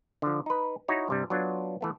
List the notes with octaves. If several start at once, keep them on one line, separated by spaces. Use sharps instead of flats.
D3 F3
D#4 B4
D#4 E4 F#4 C#5
G2 C3 G3
F#3 B3 D4 F4
E3 A3 B3